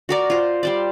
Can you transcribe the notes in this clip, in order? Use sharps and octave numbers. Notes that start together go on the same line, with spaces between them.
F#4 A#4 D5
F4 C5
G3 C5 D5